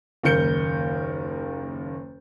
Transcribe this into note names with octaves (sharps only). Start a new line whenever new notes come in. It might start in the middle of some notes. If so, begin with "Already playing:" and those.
F#1 D#2 A#4 G6 C#7 G7